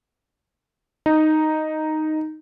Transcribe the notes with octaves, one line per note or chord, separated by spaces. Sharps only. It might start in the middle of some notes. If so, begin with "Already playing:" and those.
D#4